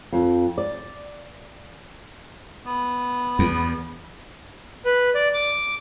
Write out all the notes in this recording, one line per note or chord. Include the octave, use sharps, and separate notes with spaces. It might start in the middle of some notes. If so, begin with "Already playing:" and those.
F2
D5
B3
E2
B4
D5
D6